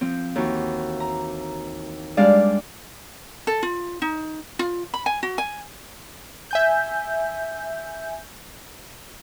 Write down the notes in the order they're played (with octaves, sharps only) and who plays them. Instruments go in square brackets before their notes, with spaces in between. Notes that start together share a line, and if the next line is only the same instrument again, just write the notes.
[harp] F3 C4
D#2 E3 F#4
A#5
[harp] G3 G#3 D4 [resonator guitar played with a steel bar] D5 F5
[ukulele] A4
F4
D#4
F4
B5
G#5
F#4
G#5
[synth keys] E5 G#5 G6